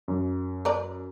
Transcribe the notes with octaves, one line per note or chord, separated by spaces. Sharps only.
F#2
A#4 B4 D5